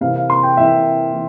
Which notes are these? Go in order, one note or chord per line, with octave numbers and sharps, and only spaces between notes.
C3 E3 A#3 F5
F5
C6
G5
C3 E3 A#3 E5
E3 A#3